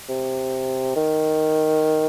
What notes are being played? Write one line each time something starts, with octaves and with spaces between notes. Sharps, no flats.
C3
D#3